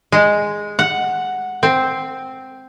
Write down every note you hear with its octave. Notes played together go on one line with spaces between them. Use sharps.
G#3
F#5
C4